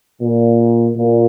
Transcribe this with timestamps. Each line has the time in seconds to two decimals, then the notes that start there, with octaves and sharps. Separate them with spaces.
0.21 A#2
0.97 A#2